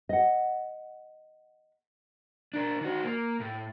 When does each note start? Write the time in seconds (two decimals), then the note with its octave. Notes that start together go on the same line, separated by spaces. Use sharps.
0.09 D#5 F#5
2.54 D4 A#4
2.81 D#3 F#4
3.04 A#3
3.40 A2